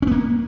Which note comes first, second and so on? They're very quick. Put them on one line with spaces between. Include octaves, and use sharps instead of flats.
C#4 B3 A#3